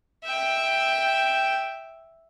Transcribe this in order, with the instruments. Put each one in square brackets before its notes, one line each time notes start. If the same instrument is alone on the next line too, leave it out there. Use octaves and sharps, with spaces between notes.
[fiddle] E5 G5